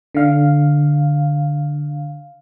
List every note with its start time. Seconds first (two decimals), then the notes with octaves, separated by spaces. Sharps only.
0.15 D3 F5